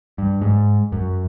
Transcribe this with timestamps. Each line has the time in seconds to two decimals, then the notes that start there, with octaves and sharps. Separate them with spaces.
0.18 G2
0.42 G#2
0.92 F#2